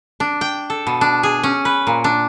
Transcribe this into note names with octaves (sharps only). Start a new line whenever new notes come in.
D4
G5
A4
B2
D4
G#4
C#4
B4
A#2
D4